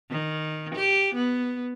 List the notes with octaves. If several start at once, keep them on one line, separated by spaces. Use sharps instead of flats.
D#3
G4
B3